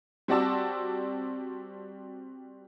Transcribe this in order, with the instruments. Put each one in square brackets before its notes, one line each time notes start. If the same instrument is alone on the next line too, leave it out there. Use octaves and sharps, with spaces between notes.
[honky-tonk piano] G3 C4 F#4 D5 A5 E6